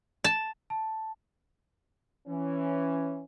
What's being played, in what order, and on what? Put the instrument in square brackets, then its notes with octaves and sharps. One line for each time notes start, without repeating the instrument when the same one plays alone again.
[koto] A5
[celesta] A5
[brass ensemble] E3 C#4